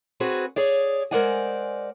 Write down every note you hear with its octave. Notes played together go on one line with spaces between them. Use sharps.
C4 F#4 G#4 B4
G#4 C#5 D5
G#3 A#4 C5 D5 F#5 G#5